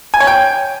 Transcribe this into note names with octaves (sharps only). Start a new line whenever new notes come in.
G#5
C#5
G5